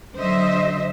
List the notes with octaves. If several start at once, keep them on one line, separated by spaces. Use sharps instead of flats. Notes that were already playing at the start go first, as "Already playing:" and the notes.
D3 F#3 C5 D#5 E5